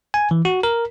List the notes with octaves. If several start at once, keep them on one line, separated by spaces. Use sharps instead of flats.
G#5
E3
F#4
A#4